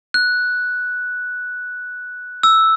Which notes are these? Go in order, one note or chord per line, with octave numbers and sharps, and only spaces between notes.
F#6
E6